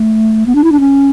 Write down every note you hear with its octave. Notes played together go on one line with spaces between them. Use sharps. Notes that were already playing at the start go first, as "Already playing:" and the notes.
Already playing: A3
B3
D4
E4
D4
C#4